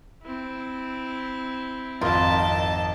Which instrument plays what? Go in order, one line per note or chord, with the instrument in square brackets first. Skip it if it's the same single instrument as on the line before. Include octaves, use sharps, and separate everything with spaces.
[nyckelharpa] C4 E4
[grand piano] G#1 F2 [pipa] F4 A#4 [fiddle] D#5 A5